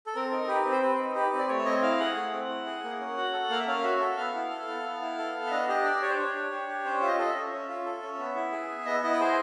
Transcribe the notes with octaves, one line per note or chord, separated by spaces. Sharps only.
A4
C4 A#4
D#4
G4 B4
C4
C5
C4 B4
D#4
G4 B4
C4
D5
A3 C#5
E5
C4 D#5
E4 F5
G#4 F#5
A3
C4
E4
G#4
A#3
C#4
F#4
A4
A#3 F5
E5
C#4 F5
F#4 E5
A4
B3 F5
E4
A4
B3
B3
E4
A4
B3
E5
D4 D#5
G4 D#5
D4 D5
G4 C#5
C5
D4 C#5
G4
D4
G4
C#4 C5
F4 E5
D#5
A4 D#5
E5
C#4
C#4
F4
A4
C#4
B3
E4
G#4
B3
B3 D#5
E4 D#5
B4
G#4 C5